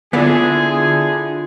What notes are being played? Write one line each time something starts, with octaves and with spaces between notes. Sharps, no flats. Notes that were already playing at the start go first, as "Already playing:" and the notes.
D3 B3 D4 E4 F4 G#4